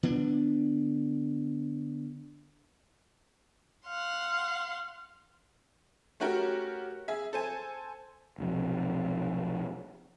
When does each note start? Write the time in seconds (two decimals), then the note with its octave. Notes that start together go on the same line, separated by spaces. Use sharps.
0.03 D3 B3 D4
3.87 F5 F#5 C6
6.20 A3 C#4 F#4 G4 A#4
7.08 G#4 E5
7.33 A4 C5 G#5
8.38 F1 B1 F2